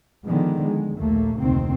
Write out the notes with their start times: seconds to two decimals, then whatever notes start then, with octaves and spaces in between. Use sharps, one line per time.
0.24 D3 D#3 F3 G#3 B3
0.62 G#3
0.97 A#1 D#2 A3 A#3
1.40 F1 D2 C3 D#3 A#3 C4